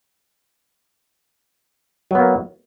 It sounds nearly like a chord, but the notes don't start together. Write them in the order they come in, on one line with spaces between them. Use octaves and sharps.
F#3 B3 A#3